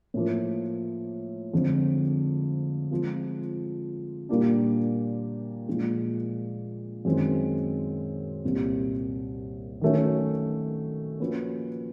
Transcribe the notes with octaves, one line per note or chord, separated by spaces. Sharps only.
A2 F3 A#3
F2 D3 F3 G#3 C4
F3 G#3 C4 F4
A#2 G3 A#3 D4 G4
A#2 F3 G#3
F#2 D#3 G#3 C4
C2 A#2 G3 C4
D#3 F#3 A3 C#4
F3 A#3 C#4 F#4 B4